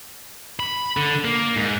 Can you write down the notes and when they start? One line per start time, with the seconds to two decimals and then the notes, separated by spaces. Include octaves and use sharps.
0.60 B5
0.97 D3
1.25 A#3
1.55 G#2